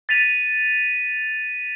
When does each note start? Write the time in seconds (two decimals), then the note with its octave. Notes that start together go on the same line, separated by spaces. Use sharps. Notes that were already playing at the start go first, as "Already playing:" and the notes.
0.09 A6 B6 D#7 F7